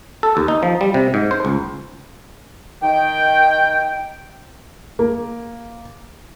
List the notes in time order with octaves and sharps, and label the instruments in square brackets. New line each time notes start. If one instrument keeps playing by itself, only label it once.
[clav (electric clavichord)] A4
D#2
D#4
F3
G3
C3
G#2
C5
C#2
[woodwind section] D#3 G5
[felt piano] A#3